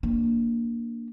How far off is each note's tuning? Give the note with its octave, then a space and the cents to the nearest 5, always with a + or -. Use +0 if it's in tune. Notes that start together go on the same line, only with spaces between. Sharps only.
A#3 +0 D4 +0